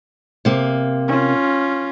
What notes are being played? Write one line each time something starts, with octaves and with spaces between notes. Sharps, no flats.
C3 A#3
C#4 F4